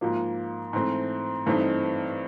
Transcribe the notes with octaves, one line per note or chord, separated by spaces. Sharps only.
G#2 F3 A#3
G#2 E3 A3 C4
G2 E3 A3 C4 D#4